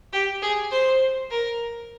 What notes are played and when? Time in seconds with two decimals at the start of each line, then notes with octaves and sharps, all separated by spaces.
0.13 G4
0.42 G#4
0.71 C5
1.30 A#4